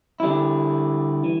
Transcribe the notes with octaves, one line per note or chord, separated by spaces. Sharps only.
D3 G3 E4
E3